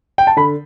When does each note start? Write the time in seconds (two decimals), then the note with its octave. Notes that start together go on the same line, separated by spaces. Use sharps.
0.18 G5
0.27 A5
0.37 D3 B5